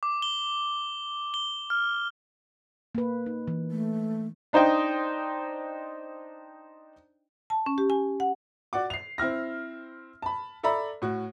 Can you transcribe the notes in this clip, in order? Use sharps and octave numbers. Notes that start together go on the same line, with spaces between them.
D6
G7
G7
F6
A#3 B4
D#4
E3
A3
D4 D#4 C5 D#5 G5
A5
C#4
G4
G#5
F#5
F#4 D5 F#5 D6
C7 F7
C4 E4 F6 A#6
A5 B5
A4 D5 E5 A#5 B5
A2 F#4